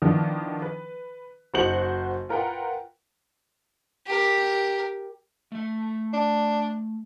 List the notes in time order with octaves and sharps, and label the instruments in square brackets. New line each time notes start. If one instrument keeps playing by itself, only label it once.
[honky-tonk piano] D#3 F3 B3 D4 E4
B4
F#1 D#4 F#4 C5 C#7 F#7
F4 A#4 B4 F#5 G5
[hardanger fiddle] G4 A#4
[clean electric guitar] A3 E5
[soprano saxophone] D4